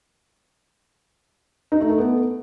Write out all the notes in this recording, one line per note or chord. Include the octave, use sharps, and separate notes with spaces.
D#4
A3
A4
B3